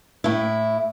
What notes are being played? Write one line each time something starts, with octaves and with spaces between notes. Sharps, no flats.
A2 E4